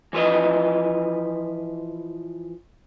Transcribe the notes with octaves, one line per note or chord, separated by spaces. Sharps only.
E3 F3 B4 D#5